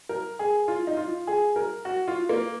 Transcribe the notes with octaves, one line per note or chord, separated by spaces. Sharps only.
A#4
G#4
F4
D#4
F4
G#4
A#4
F#4
F4
A#3